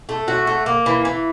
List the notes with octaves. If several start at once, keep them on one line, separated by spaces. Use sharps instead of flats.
A3
F#4
A3
A#3
E3
E3